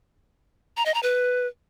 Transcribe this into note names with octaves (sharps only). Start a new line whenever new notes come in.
A#5
D#5
A#5
B4